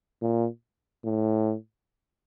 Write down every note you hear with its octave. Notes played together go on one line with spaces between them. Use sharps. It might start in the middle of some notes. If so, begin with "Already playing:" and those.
A#2
A2